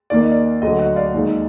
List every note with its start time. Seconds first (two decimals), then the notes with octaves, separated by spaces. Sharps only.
0.10 D#2 D#3 A#3 D5
0.21 D#5
0.32 D5
0.62 D2 D3 F#3 D#5
0.79 D#5 F#5
0.96 D5 F5
1.13 D#2 D#3 G#3 D#4 D5